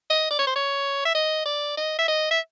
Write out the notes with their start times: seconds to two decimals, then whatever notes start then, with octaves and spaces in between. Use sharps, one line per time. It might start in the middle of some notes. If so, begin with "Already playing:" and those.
0.10 D#5
0.31 D5
0.39 C#5
0.47 C5
0.56 C#5
1.05 E5
1.15 D#5
1.45 D5
1.77 D#5
1.99 E5
2.08 D#5
2.31 E5